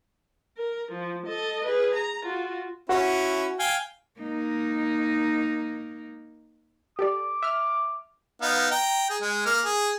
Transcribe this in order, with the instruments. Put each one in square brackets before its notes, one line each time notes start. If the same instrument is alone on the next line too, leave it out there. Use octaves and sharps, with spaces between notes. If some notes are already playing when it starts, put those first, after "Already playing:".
[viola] A#4
F3
A4 D#5
G#4 B4
A#5
F4 F#4
[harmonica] C#4 E4 [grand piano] F#4
[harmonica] F5 G5 G#5
[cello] A#3 D#4
[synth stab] G4 A4 D5 [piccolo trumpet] D6
[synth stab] E5 F6
[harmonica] B3 D#4 F5
G5 A#5
G#4
G#3
A#3 F6
G#4